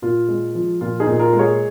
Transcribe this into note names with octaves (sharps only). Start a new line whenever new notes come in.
A#2 F4
G#3
F3
A#2 F4
D#4 G#4
A#2
F4 A#4
G#3
G#4 C#5